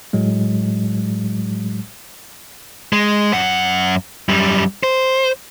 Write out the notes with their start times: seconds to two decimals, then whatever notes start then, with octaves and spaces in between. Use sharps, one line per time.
0.13 A2 F#3 G#3
2.93 G#3
3.33 F#2 F#5
4.29 F#2 G3
4.83 C5